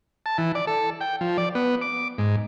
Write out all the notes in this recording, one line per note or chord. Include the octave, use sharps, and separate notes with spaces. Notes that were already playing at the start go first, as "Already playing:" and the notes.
A5
E3
D5
A4
G5
F3
D5
B3
D6
G#2